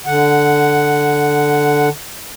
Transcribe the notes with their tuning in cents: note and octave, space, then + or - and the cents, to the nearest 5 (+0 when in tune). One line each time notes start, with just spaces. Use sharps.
D3 +0 F#5 +0